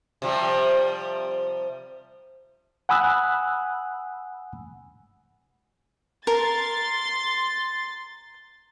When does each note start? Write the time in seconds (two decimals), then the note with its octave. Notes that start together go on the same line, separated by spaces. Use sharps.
0.22 C3 F3 G3
2.89 F#5 G#5 B5 D#6 E6 F#6
6.27 A#4 C6 A6